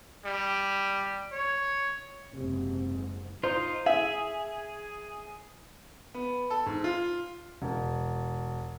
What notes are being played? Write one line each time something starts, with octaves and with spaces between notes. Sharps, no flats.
G3
C#5
F#1 G#2 C3
D#4 F4 C5
G#4 E5
B3
A4
G#2
F4
E1